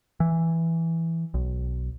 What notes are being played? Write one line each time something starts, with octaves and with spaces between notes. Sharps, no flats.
E3
B1